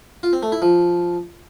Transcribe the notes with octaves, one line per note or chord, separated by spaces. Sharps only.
F4
C4
A3
E4
F3